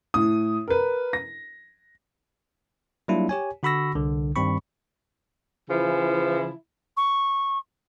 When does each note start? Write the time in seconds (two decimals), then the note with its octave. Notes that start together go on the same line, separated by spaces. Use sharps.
0.14 A2 D#6
0.68 A#4 B4
1.13 A#6
3.08 F#3 G3 A#3 D4 E4 F4
3.29 G4 C#5 G#5
3.63 D3 F#4 B5 C#6 E6 A#6
3.95 C2 D3
4.36 G2 D#3 G3 C4 B5 C#6
5.69 C#3 E3 F3 E4
6.97 C#6